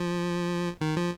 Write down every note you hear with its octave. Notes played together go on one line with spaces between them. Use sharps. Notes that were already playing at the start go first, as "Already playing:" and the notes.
Already playing: F3
D#3
F3